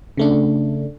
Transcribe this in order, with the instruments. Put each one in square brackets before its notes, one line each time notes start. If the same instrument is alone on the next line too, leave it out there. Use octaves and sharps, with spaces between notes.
[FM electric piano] C#3 A3 D4